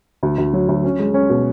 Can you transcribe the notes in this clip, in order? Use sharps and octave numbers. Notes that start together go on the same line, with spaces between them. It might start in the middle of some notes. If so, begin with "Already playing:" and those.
D2
D2
F#3
D2
C#4
G#3
C#4
B2